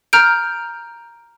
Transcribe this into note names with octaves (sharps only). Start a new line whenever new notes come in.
A#5 F6 G6 D7